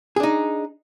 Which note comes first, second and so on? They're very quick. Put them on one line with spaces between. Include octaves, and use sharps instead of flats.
G#4 D4 D#4